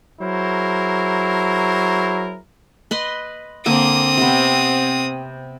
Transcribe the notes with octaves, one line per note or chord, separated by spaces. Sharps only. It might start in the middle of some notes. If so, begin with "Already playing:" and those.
F#3 E4 G#4 A#4 C5
B4 D#5 C6
D3 A#3 C4 D6 D#6
C3 B3